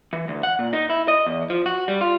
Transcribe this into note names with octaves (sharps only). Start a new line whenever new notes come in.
E3
D2
F#5
A#2
D#4
E4
D#5
E2
F3
F#4
G3
F4